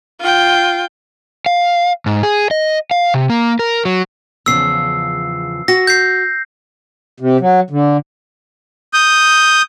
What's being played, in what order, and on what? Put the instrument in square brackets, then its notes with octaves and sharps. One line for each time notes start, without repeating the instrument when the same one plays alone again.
[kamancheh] F4 G5
[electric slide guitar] F5
G#2
G#4
D#5
F5
C3
A#3
A#4
F#3
[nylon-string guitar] E2 C#3 F3 [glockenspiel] E6 C7
[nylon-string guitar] F#4 [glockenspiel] A#6
[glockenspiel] G6 C7
[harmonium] C3
F#3
D3
[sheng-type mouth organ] D#6 G6